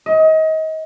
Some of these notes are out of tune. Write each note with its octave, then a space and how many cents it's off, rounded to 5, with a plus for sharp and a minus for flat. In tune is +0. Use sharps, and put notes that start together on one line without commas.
D#5 +30